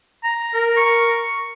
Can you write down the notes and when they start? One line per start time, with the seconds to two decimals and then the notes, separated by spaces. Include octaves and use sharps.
0.24 A#5
0.54 A#4
0.77 C#6